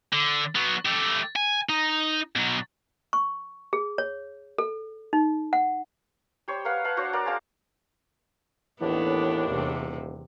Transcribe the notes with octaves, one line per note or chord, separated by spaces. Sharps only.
D3
F#3 B3
A3 G4
G#5
D#4
B2 F#3
C#6
G#4
C#5
A4
D#4
F#5
G3 C5 C#5
A#4 B4 F5 F#5
B4 F5 F#5 A5
D4 F#4 C5 C#5
A#4 D5 F#5 A#5
G#4 C5 F5 A5
D#2 A2 E3 B3 D4
D#1 E2 C3